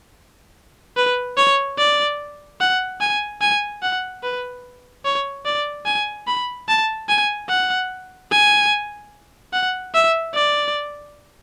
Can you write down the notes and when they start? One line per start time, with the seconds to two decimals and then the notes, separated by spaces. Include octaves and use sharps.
0.97 B4
1.37 C#5
1.78 D5
2.60 F#5
3.01 G#5
3.41 G#5
3.82 F#5
4.23 B4
5.05 C#5
5.45 D5
5.86 G#5
6.27 B5
6.68 A5
7.09 G#5
7.49 F#5
8.31 G#5
9.53 F#5
9.94 E5
10.34 D5